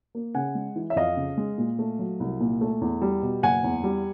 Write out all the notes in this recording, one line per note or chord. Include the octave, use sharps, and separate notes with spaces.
A#3
C#3 F#5 G#5
G#3
E3
E5
F2 D#5 F5
C#3
G#3
A#2
A3
F#3
C2
A#2
A3
E2
G3
B2
F#1 F#5 G#5
E2
G3